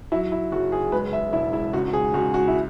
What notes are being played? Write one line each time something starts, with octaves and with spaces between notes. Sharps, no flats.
F#3 E4
E4
F#1 F#4
G#4
G#3 B4
E5
E1 E4
E4
C#2 F#4
F#4
G#4
C#2 F#4
F#4
E4